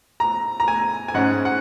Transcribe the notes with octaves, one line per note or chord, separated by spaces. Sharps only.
A#5
A#5
G#5
G#5
G#2 G#3 C#4 F#5
F#5